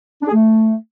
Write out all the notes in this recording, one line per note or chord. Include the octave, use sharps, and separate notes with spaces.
D4
G#4
A3